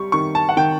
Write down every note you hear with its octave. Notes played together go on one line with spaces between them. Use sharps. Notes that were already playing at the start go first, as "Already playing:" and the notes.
Already playing: G3 C#6
D#3 C#6
A5
F#5
D#3 G5